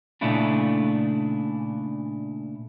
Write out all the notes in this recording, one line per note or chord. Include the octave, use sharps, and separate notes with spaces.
A#2 C#3 A3 D4 E4 F4